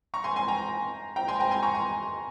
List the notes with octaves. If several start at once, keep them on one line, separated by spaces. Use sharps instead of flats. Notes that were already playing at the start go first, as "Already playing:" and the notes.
A#5 C#6
G#5 C6
G#5 C6
G5 A#5
G5 A#5
G#5 C6
G5 A#5
G#5 C6
A#5 C#6
G#5 C6